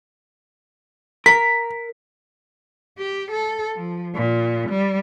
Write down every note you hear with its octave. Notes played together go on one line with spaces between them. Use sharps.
A#4 B6
G4
A4
F3
A#2
G3